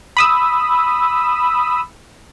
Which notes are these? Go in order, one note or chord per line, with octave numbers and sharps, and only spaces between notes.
B5 D#6 E6